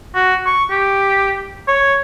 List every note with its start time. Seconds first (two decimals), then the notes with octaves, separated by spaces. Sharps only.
0.15 F#4
0.46 C#6
0.71 G4
1.68 C#5